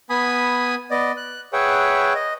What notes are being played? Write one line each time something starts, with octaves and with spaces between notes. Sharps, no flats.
B3 G#5 B5 D#6
B3 D5 D#5
F#6
G#4 B4 C#5 E5 F#5 G5
D#5